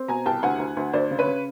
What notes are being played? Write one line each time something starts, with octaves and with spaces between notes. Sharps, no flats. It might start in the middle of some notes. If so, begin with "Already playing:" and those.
Already playing: C4
B2 G#5 A#5
C2 G5 A5
D2 F#5 G#5
D2
D2
D2 C5 D5
C#3
B4 C#5
C#3